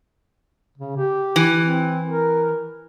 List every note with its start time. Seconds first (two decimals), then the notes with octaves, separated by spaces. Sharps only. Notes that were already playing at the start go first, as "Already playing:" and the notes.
0.78 C#3
0.97 G4
1.36 E3
1.61 C4
2.07 A#4